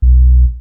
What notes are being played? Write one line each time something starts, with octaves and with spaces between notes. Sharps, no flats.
B1